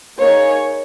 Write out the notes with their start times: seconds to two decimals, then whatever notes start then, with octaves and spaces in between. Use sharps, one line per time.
0.19 A#3 D#4 G#4 C#5